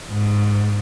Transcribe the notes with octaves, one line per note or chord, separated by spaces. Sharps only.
G#2